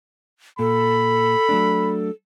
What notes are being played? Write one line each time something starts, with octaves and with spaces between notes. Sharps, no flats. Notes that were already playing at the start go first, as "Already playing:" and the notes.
A#2 A4 B5
F#3 A3 D4